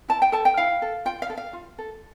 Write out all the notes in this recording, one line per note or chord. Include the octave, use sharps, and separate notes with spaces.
E4 A5
G5
A4 A5
G5
E4 F5
A4
F4 G5
F5
A4
F5
F4
A4